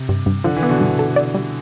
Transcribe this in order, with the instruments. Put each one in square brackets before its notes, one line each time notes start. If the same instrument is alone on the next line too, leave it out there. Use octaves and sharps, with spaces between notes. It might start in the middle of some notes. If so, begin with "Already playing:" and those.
Already playing: [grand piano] C3
[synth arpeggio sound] G2
G2
[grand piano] D3 [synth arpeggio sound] F3
[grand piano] E3
[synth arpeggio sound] B3
[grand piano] B2 D3
[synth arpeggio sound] G2
A4
D5
G3